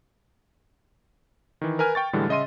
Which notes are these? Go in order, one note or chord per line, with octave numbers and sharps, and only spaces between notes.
D#3 E3
A#4 B4 G#5 F6
G5 C#6 A6
A2 D3 E3 G3 G#3
C#3 D#5 E5 C6 D#7